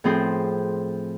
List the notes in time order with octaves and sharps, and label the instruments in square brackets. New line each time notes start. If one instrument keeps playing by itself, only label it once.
[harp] A2 F3 C4 G#4 C5